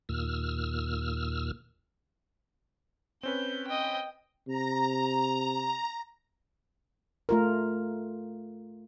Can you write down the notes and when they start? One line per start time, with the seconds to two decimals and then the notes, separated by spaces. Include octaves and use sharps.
0.09 D#2 A#2 E6 F6
3.23 C4 C#4 B4 G6
3.68 D#5 G5
4.48 C3 A#5
7.29 A3 F4 A#4